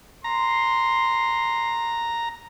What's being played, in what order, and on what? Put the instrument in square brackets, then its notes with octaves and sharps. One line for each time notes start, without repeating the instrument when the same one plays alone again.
[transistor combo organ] A#5 [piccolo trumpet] C6